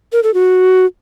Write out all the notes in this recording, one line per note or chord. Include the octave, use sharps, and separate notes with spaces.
A#4
A4
F#4